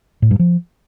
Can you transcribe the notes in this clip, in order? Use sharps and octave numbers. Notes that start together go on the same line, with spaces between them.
A2
G2
F3